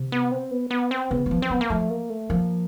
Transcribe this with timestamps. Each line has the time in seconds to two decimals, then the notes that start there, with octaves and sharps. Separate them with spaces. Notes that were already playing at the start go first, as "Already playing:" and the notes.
Already playing: C3
0.12 B3
0.32 C4
0.51 B3
0.70 B3
0.91 C4
1.10 C#3 B3
1.26 F#3
1.31 F3
1.42 C4
1.50 F#3 B3
1.61 A#3
1.70 F3 A3
1.90 A#3
2.10 A3
2.29 F3 A#3